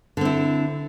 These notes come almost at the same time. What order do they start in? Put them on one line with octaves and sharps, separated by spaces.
D3 C4 E4